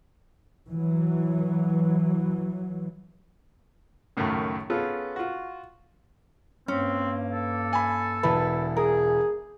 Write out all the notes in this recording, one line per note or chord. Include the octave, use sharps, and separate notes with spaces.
E3 F#3
C#2 F#2 A2 D#3 A3 A#5
B3 C#4 F4 G#4 A4 B4
F4 F#4
G2 A#3 C4 C#4
A4
G#5 B5
E1 E4 B4 A5
G#4 A#4